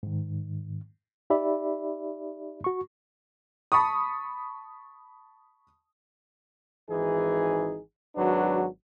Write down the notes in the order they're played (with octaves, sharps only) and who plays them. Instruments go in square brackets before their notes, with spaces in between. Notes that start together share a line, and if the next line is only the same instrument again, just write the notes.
[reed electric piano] G#2 D#3
D#4 G4 D5 E5 B5
F#4 C#6
[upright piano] A5 B5 C#6 D#6
[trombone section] G#1 E3 D#4 G#4
G#1 F#3 D4 F#4 B4